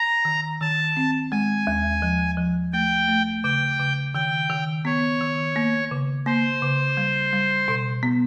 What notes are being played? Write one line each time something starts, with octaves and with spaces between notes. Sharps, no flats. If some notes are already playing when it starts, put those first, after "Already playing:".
Already playing: A#5
D#3
D#3 A5
C4
G#3 G#5
D#2
F3
F3
A3 G5
A3
C#3 G5
C#3
D#3 G5
D#3
B3 C#5
D#3
A#3
C#3
A#3 C5
C#3
G3
G3
B2
B3